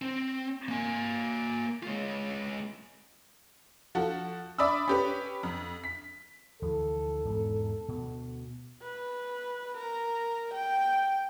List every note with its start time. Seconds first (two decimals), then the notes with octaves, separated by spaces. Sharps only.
0.02 C4
0.68 A#3 G#5
1.83 G#3 F4
3.95 F3 F#4 A4
4.58 D5 E5 B5 D#6 E6
4.88 C#4 G4 B4
5.43 F2
5.84 B6
6.62 D2 E3 F3 A4
7.25 E1 G#2
7.88 D2 B2
8.82 B4
9.77 A#4
10.54 G5